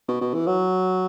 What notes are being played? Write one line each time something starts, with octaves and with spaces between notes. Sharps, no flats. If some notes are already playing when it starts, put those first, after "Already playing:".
B2
B2
E3
F#3